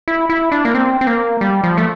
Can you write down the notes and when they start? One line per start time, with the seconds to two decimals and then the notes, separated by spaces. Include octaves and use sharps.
0.08 E4
0.30 E4
0.52 D4
0.65 A#3
0.75 C4
1.01 C4
1.07 A#3
1.41 G3
1.64 F3
1.78 A3